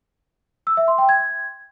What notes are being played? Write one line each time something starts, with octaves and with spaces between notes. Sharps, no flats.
E6
E5
C6
G5
G#6